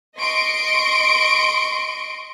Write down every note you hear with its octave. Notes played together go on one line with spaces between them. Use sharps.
D#5 C6 C#6 D7